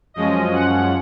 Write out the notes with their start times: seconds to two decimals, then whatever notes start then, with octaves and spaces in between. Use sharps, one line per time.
0.14 F#2 F3 G#3 C#4 D#5
0.53 F#5